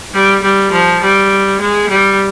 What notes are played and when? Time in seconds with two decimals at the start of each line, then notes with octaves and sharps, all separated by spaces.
0.14 G3
0.43 G3
0.72 F3
1.02 G3
1.60 G#3
1.89 G3